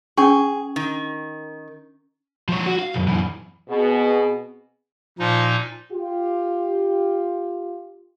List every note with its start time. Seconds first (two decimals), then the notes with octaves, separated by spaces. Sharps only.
0.17 C#4 G#4 G5 C#6
0.76 D#3
2.49 F3 C#5
2.66 F#4
2.79 F5
2.94 B1 F#2
3.07 F#2 E3
3.69 B2 B3 C4 G#4
5.19 A#2 F3 D#4
5.91 F4 G4